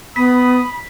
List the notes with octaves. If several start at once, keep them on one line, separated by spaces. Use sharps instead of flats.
B3 B5 D#6 B6